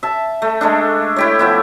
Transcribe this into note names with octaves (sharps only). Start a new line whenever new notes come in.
E5 A5
A3
G#3 A3 D4
E4 G4 C#5
F3 B3 E4